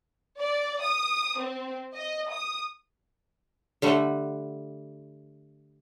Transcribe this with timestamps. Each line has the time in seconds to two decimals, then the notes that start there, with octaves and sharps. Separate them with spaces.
0.39 D5
0.83 D#6
1.38 C4
1.95 D#5
2.32 D#6
3.82 D3 G3 A3 F#5